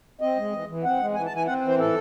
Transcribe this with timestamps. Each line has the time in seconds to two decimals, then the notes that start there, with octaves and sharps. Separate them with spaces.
0.21 C4 D#5
0.37 G#3
0.53 E3
0.68 E3
0.83 C4 F#5
0.99 G#3
1.15 E3 G#5
1.25 A5
1.31 E3 G#5
1.46 C4 F#5
1.62 E3
1.68 C5
1.78 A2 A4